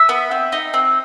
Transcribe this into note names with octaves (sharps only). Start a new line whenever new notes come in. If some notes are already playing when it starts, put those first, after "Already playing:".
Already playing: E5
B3
C4
D#4
C4